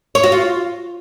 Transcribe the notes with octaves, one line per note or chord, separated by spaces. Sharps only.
C#5
F#4
F4